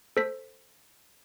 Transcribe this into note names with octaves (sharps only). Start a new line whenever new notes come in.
A4 C5 B6